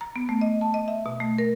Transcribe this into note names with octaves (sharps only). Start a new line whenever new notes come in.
A#5
B3
A3
D#5
A5
D#5
E5
B2
A3
A#4